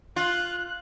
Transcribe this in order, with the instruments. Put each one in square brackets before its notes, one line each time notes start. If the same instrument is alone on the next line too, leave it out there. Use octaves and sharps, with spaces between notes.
[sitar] F4 [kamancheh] F#6